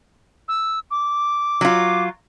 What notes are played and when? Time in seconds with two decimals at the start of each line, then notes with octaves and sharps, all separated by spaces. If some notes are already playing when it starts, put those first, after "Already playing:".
0.48 E6
0.91 D6
1.61 F#3 F4